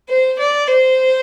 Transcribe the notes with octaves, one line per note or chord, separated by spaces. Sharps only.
C5
D5
C5